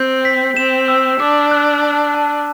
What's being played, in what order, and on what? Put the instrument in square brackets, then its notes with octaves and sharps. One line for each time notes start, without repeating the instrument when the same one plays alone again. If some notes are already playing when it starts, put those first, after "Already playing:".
Already playing: [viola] C4 [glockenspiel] G6
[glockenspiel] B6
[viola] C4 [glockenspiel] E7
[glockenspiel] E6
[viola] D4 [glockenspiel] D6
[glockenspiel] F#6
A5
A5